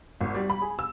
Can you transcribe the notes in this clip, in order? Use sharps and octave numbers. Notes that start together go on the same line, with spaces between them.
G#1
G3
B5
G#4
E6